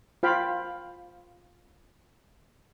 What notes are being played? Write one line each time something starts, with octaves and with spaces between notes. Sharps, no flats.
F4 C5 F5 G5 B5